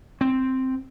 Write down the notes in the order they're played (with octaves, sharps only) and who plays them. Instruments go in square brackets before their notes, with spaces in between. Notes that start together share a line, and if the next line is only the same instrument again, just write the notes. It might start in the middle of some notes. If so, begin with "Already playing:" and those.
[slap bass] C4